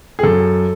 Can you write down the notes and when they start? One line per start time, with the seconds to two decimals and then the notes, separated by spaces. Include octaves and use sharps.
0.19 G#4
0.23 F#2 A4